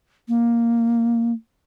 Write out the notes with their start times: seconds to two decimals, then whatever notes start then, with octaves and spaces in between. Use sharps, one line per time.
0.28 A#3